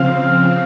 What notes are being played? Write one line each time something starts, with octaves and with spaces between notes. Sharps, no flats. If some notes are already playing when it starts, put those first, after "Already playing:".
Already playing: C#3 F3 C4 F5